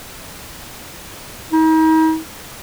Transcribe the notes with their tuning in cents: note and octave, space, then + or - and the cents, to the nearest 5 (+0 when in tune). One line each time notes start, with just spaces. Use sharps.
D#4 +40